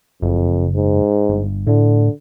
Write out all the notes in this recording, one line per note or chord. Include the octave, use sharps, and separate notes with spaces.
F#1 F2
G#2
G1
A2 D3